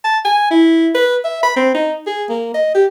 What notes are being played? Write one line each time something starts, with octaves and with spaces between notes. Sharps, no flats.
A5
G#5
E4
B4
E5
B5
C4
D#4
G#4
A#3
D#5
G4